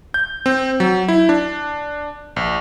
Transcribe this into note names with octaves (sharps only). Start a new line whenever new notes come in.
G6
C4
F#3
E4
D4
A#1